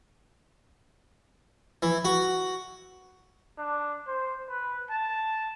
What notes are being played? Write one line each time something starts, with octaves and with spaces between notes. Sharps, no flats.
E3
F#4
D4
C5
B4
A5